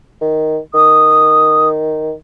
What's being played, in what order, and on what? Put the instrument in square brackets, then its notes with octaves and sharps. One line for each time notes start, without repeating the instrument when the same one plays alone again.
[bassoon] D#3
[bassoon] D#3 [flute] D#6